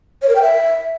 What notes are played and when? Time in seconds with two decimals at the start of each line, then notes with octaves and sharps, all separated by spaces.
0.22 C#5
0.29 A#4
0.35 G5
0.42 E5